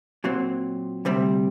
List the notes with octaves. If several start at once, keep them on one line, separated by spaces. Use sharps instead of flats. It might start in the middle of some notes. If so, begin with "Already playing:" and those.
A#2 F#3 C4
D2 C3 G3 C4